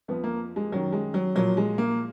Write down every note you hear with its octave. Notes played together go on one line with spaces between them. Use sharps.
F2 F3 B3
A#3
G#3
F#2 D#3 F#3
G#3
F#3
A#2 F3 F#3
G#3
A#3